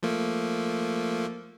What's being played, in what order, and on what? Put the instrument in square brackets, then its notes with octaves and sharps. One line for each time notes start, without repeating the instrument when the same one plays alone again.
[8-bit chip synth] F3 A3 A#3